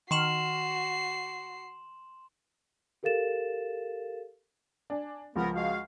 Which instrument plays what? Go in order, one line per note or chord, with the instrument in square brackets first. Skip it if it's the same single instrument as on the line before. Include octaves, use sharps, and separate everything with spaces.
[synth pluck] D#3 C#6 F6 [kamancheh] F#4 [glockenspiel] C6 E7 F#7 [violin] C7
[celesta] G4 A4 A#4 F5 A6 E7
[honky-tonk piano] D4 G#5
[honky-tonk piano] C#2 F3 [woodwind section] B3 A#4
[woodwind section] G#3 F#4 F5